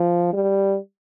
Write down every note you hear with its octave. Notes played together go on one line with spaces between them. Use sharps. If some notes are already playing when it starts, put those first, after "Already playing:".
Already playing: F3
G3